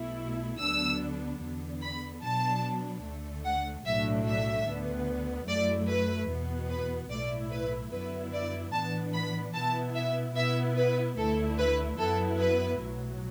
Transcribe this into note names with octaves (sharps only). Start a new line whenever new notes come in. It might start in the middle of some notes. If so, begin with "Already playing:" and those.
Already playing: B1 B2 A3 E4
D2 D3 F#3 B3 D4 E6
E2 D3 B3
B5
B2 F#3 B3 D4 A5
D2 D3 A3
F#5
B1 A2 F#3 A3 D4 E5
E5
D2 D3 B3
F#2 F#3 A3 E4 D5
B4
E2 B2 B3
B4
B1 A2 A3 E4 D5
B4
F#2 D3 F#3 B3 E4 B4
D5
A2 E3 B3 D4 A5
B5
B2 B3 E4 A5
E5
B2 B3 E4 E5
B4
D2 D3 A3 E4 A4
B4
F#2 F#3 B3 E4 A4
B4
B1 A2 F#3